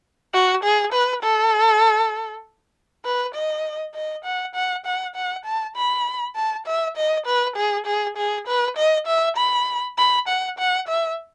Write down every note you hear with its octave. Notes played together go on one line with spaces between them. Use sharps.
F#4
G#4
B4
A4
B4
D#5
D#5
F#5
F#5
F#5
F#5
A5
B5
A5
E5
D#5
B4
G#4
G#4
G#4
B4
D#5
E5
B5
B5
F#5
F#5
E5